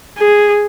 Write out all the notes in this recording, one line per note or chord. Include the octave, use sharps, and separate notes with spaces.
G#4